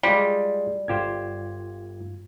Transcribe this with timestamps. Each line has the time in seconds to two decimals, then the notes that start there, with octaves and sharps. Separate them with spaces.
0.03 G3 G#3 F4 G5
0.88 G1 G2 F4 G4 C5 G#6